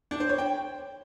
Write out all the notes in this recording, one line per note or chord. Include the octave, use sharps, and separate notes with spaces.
D4
C5
C#5
G5